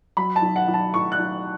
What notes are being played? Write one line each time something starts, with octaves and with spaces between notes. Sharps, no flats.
F#3 B5
A5
B1
F#5
B1
A5
A2 C#6
F#6
B1